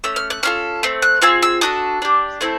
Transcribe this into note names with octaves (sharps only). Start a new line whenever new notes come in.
A3 C#4 E6
F6
F#6
C#4 F4 A4 F6
A3 C4
F#6
C4 F4 G#4 E6
E6
D4 F#4 A4 D#6
D4 G4
A3 C4 E4 A4